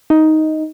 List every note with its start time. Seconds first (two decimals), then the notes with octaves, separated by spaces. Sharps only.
0.10 D#4